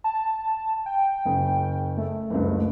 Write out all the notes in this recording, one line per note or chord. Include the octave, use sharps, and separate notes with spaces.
A5
G5
F#1 C#3
A3
F#1 C#2 G2